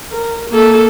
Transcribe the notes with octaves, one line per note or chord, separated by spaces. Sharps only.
A#4
A#3 A4